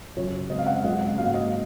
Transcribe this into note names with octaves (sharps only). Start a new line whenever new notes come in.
F#2 C#3 F#3 C#5
C#3 G#3 C4 D#5
F5
F#5
F5
F#2 C#3 G#3 C4 D#5
F#5
G#2 F#3 A#3 F5
D#5